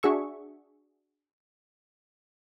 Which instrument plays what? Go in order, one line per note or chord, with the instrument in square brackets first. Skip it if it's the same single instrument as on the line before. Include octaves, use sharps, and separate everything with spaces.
[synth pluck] D4 F#4 G#4 E5 C#6